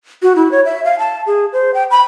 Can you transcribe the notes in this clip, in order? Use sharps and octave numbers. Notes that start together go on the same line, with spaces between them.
F#4
E4
C#5
E5
F5
A5
G#4
C5
G5
B5